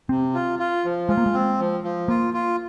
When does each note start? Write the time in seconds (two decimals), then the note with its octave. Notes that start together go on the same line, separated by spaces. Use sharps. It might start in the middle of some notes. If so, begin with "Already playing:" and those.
0.09 C3 C4
0.34 F4
0.59 F4
0.85 F3
1.09 G#3 F4
1.17 A#3
1.26 G#3
1.34 C4
1.60 F3
1.84 F3
2.08 A#3 F4
2.34 F4